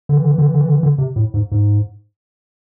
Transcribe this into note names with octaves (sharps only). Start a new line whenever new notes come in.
D3
E3
D3
E3
D3
E3
D3
E3
D3
E3
D3
C3
A2
G#2
G#2